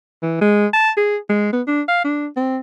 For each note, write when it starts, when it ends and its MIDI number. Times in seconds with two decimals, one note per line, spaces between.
0.23 0.41 52
0.41 0.66 56
0.74 0.90 81
0.97 1.17 68
1.30 1.50 56
1.53 1.62 59
1.67 1.82 62
1.88 2.02 77
2.05 2.27 62
2.37 2.59 60